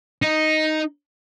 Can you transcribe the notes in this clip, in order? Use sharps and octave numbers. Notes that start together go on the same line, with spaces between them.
D#4